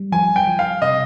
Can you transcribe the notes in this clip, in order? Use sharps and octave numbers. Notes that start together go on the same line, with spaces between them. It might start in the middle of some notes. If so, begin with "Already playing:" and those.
Already playing: G3
F3 G#5
G5
F3
F5
C3 D#5